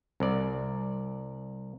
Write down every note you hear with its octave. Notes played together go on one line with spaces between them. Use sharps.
C2 D5